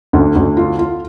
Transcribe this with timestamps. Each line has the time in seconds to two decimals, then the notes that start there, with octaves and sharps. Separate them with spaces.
0.13 D2
0.35 D2
0.57 F4
0.79 F4